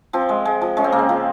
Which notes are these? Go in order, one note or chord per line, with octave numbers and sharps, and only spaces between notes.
F3 C4
G#3
G#3
F3
G#3 C#4
C4
C#3 A#3
C4
F3